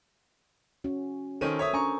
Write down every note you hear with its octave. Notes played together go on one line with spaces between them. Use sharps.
C#4 F#4
D#3 C#4 A4 A#4 C5 D#7
C#5 E5 D#6
C#4 D4 G#5 A#5 C#6